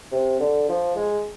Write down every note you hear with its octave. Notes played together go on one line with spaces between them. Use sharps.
C3
D3
F3
G#3